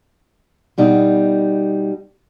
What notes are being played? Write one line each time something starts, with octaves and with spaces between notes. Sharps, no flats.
B2 G3 D#4